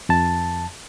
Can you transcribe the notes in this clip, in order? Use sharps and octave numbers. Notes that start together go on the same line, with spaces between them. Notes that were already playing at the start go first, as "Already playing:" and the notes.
F2 A5